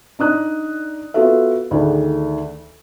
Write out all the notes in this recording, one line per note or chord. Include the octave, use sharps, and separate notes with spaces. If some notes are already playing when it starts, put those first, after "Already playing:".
D4 D#4 D#6 F#6
B3 F4 F#4 A4 E5
D2 D3 D#3 D4 G#4